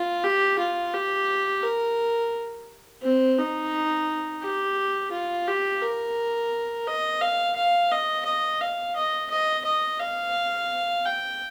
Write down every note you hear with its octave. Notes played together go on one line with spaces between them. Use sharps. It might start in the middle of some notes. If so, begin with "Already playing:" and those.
Already playing: F4
G4
F4
G4
A#4
C4
D#4
G4
F4
G4
A#4
D#5
F5
F5
D#5
D#5
F5
D#5
D#5
D#5
F5
G5